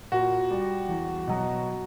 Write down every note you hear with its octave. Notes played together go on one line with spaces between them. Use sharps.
A#2 F#4
G3
E2
B2 F#3